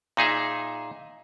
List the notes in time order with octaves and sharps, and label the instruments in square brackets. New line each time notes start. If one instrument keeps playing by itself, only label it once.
[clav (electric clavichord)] A#2 D#4 G#4 E5